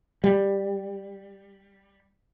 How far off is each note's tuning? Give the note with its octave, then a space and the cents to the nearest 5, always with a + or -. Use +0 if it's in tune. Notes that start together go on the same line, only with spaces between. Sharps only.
G3 +10